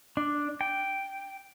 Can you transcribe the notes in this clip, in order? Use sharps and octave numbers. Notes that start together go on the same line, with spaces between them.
D4
G5